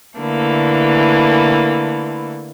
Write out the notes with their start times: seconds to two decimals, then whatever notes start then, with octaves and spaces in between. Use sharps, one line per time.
0.20 D3 E3 A3 A#3